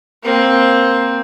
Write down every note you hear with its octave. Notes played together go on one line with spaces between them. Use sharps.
A#3 C4